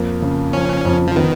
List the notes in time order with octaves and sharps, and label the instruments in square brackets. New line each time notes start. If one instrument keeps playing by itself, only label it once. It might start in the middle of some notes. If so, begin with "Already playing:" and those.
Already playing: [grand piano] F2 A#3
C#3
[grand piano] F3 [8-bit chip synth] C#4
[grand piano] F2
[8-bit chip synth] F3
[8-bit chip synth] D#3 [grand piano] B3